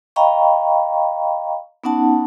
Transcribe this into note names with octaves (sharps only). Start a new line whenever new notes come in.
D#5 F5 G5 A#5 B5 C#6
B3 C#4 D#4 F#5 A5